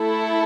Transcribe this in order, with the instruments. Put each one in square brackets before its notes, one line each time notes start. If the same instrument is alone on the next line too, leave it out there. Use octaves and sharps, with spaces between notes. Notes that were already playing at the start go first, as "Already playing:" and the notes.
Already playing: [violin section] A3 E4 A4